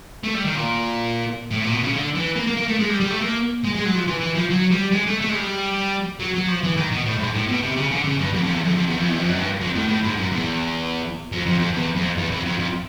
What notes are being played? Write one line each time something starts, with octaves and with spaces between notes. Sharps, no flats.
A3
G3
D#3
A#2
A2
A#2
B2
C#3
D3
E3
A#3
A#3
A#3
A3
G#3
G3
G3
A3
A#3
G#3
G#3
F#3
F3
E3
E3
F3
F#3
G3
G#3
A3
A3
G#3
G3
F#3
F#3
F3
E3
D#3
B2
A2
G#2
A2
B2
C3
C#3
D3
C#3
G2
F2
F2
E2
F2
F2
E2
F2
E2
F2
F#2
G2
F2
A2
A2
G#2
F#2
E2
F2
F2
F2
E2
F2
E2
F2
F2
F2